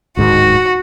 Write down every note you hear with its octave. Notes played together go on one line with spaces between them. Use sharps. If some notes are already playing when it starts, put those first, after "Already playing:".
D1 G#2 D#3 F#4